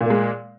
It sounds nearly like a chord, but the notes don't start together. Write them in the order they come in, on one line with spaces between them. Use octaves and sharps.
A#2 A#3 G#3